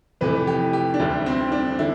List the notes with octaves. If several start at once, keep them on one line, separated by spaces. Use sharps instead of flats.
F2 C3 E3 A3 B4
G4
G4
D4
D2 D3 G3 E4
C4
D4
D3 E4